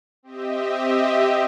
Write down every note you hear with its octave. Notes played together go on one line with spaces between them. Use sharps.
C4 G4 D#5 E5